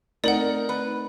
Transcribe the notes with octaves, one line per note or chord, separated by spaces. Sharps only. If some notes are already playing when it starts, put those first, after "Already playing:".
A3 C4 D#4 A#4 D5 F#5 F#7
B4